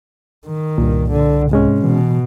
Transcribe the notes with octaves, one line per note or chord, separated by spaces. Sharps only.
D#3
C2 G2 A#2
D3
G#2 C3 G#3 C#4
B2 E3